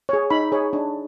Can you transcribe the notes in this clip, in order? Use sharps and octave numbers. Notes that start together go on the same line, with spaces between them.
G#4 C#5
D#4 B5
G#4 C#5
D4